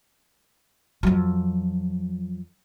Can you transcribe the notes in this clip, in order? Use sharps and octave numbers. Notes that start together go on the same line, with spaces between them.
F2 F#3